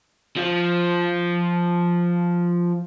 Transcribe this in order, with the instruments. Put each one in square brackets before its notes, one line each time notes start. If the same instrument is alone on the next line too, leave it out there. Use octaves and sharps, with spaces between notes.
[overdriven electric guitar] F3 F4